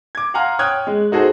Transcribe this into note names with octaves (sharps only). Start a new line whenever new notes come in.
D6 G#6
F5 F#5 G#5 A#5 C6 F6
C#5 G5 D#6 F6 F#6 G#6
G#3
D#4 F#4 G#4 A4 C5